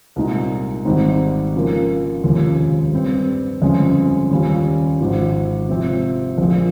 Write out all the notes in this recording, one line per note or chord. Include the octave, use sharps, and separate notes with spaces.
C2 A#2 G#3 D#4
G#1 G#2 G3 C4 D#4
C#3 F3 A#3
F1 D#2 C#3 F3 G#3
G2 G3 C4
G1 F2 C#3 G#3 C#4
D#2 C#3 G3 C#4 F4
G#1 G#2 F3
C3 F3 C4
A#1 A#2 F3